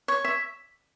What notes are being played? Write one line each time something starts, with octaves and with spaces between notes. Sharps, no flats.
C#5
E5